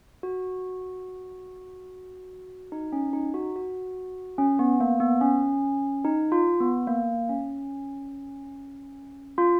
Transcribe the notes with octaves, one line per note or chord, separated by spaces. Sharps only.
F#4
D#4
C#4
D#4
F#4
F#4
C#4
B3
A#3
B3
C#4
D#4
F4
B3
A#3
C#4
F4